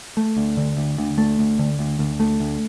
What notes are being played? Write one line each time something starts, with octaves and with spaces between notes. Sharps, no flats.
A3
D2
D3
D2
D2
A3
D2
D3
D2
D2
A3
D2